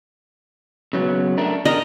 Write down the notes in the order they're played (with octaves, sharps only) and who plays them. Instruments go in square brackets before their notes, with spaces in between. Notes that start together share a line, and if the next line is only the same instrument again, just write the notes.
[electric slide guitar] C#3 F#3 B3
A3 D4 A#4
[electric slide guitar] D4 A#4 [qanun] D#5